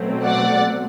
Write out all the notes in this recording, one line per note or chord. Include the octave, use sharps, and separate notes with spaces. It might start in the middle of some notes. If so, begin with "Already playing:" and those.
Already playing: B2 F#3 A3 C4
D5 F#5